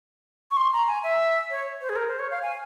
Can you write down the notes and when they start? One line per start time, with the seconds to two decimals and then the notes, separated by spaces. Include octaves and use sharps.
0.51 C#6
0.57 C6
0.73 A#5
0.88 G#5
1.04 E5
1.50 C#5
1.82 C5
1.89 G#4
1.96 A#4
2.08 C5
2.19 C#5
2.31 F5
2.42 G#5